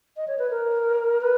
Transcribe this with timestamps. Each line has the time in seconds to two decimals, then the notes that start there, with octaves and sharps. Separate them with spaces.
0.17 D#5
0.27 C#5
0.39 B4
0.50 A#4
1.21 B4